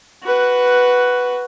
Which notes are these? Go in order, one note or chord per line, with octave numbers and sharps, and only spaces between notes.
F#4 B4